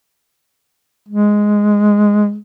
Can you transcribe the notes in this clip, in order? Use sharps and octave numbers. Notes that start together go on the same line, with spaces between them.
G#3